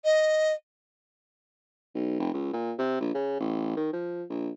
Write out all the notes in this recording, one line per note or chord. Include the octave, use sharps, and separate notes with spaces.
D#5
B1
F1
C#2
A#2
C3
A#1
C#3
A1
D#3
F3
A#1